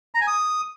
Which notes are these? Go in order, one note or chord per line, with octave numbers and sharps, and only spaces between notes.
A#5
G#5
D#6